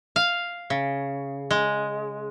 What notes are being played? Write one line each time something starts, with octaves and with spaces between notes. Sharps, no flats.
F5
C#3
G#3